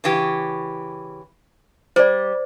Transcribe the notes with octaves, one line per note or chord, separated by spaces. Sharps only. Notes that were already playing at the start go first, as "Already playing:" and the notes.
C#3 E3 G4
G3 C5 D5